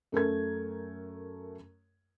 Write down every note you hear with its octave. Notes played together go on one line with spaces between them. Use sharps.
F#2 A3 A#4 G#6